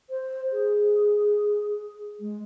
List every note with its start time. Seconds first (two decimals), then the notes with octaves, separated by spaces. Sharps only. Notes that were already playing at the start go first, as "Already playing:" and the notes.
0.10 C5
0.52 G#4
2.20 G#3